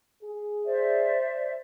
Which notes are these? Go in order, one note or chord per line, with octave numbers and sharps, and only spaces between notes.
G#4
C5 D5 E5